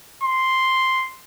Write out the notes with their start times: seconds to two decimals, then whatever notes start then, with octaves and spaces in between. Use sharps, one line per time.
0.23 C6